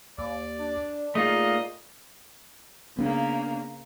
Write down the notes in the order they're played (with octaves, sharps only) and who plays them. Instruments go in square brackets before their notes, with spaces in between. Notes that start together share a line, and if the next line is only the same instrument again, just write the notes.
[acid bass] D#2 [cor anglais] D5
[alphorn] D4
[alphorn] A#2 [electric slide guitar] A3 D#4 F4 [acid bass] G#4 [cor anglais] D#5
[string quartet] C#3 A#3 [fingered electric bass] B3 D4